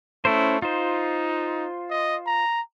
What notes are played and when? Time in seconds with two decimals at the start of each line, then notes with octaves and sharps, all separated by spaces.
0.25 A3 C#4 E4 C5
0.62 D#4 F4 C5
1.90 D#5
2.27 A#5